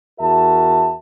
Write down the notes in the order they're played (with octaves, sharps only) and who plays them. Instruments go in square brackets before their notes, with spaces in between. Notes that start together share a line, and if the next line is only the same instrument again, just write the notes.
[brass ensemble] E2 F#4 A#4 E5 A5